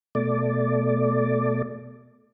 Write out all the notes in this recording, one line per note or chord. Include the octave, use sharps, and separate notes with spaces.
B2 A3 D5